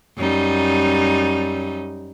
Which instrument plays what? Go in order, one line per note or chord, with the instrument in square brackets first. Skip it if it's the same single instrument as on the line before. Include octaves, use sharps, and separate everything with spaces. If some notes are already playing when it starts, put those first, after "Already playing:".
[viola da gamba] F#2 G3 D#4